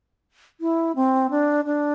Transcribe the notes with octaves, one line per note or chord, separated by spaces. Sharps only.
E4
C4
D4
D4